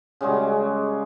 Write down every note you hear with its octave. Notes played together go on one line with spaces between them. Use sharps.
C#3 G3 G#3 F#4